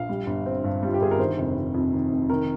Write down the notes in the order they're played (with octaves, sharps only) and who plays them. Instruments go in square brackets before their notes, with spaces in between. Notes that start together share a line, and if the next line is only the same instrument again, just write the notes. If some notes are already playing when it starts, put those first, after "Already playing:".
Already playing: [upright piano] A#1 F5
G3
G1
C4
G2
G3 F4
G4
G1 G#4
A#4
D#3 C5
F1
F1
F2
D#3
F1
D#3 A#4